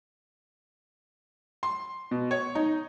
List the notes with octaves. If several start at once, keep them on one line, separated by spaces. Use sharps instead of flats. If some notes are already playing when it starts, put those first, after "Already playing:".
C6
B2
C#5
D#4